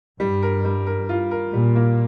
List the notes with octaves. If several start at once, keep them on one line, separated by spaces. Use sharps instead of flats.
G2 G3
A#4
G3
A#4
F4
A#4
A#2 G3
A#3